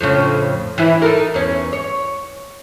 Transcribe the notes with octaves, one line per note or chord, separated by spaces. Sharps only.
F2 A2 C#3
E3 E4
D#4 A4 A#4
E2 C#4
C#5